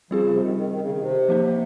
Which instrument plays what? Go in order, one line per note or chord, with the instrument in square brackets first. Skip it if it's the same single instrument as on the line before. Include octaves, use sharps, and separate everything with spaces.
[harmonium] F3 [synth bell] G3 C4 F4 G#4
[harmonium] C#3
C3
D#3
D#3
D#3
C#3
D#3
C3
[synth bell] F3 A#3 D#4